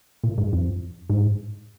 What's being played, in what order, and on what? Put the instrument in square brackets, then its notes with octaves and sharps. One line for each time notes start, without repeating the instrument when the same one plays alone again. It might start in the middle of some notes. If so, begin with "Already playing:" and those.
[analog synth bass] A#2
G#2
F2
G#2